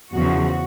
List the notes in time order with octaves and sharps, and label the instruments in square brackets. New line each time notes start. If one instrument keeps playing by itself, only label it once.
[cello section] E2 C#3 F3 F#4